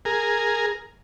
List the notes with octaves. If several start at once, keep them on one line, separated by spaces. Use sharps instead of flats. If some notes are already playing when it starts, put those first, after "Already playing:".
G#4 A#4